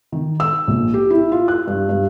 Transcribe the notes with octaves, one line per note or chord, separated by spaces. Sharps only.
D#3
E6
A#1
G4
E4
F4
F#6
G2
G2